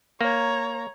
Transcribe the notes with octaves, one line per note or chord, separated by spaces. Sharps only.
A#3 C#5 A#5